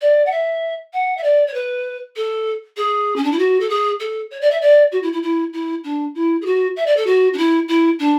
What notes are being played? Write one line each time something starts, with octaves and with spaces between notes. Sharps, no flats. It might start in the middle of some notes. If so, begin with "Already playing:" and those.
D5
F#5
E5
F#5
E5
D5
C#5
B4
A4
G#4
C#4
D4
E4
F#4
A4
G#4
A4
C#5
D5
E5
D5
F#4
E4
E4
E4
E4
D4
E4
G#4
F#4
E5
D5
A4
F#4
D4
E4
E4
D4